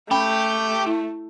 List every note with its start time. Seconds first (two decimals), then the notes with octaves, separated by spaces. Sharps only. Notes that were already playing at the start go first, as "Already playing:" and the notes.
0.11 A3 C#4 G4 G5 B5
0.86 E4